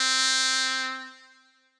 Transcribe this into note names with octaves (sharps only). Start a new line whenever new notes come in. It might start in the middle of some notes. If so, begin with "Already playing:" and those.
Already playing: C4